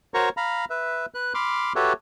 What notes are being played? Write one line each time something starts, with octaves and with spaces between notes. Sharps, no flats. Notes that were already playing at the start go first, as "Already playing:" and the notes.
F#4 A#4 C5 C#5 A#5 C#6
F5 A#5 B5
B4 E5
B4 F#6
B5 C6 D6 F6
F#4 G4 A4 B4 C#5 E5